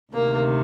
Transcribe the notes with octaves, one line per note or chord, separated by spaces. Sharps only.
D2 C3 D#3 A#3